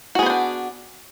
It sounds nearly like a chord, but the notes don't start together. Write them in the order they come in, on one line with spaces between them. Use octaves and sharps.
F#4 G#4 B3 C5 D4